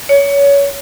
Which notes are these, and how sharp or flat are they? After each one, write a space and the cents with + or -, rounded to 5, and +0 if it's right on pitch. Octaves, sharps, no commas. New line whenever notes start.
C#5 +25